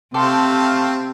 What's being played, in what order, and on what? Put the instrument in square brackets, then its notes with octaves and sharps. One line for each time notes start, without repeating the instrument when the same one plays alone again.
[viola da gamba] C3 [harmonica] A3 C4 F5 [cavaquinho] G4 A4 C6